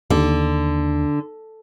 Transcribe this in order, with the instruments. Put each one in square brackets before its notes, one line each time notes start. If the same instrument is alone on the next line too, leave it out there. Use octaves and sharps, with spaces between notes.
[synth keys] D#2 [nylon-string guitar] D3